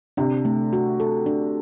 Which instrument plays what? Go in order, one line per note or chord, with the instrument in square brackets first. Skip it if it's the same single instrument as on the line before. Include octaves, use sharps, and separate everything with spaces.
[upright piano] C3 [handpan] D4
[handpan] A3
F#4
A4
D4